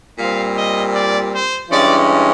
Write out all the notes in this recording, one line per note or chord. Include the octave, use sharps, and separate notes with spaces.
A#2 G3 C4 F5
D#5
D5
C5
G2 E3 G#3 C#4 D5